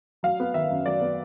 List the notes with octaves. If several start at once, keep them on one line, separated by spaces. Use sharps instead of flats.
F#3 F5
B3
D#3 E5
F#2
F#3 D5
B3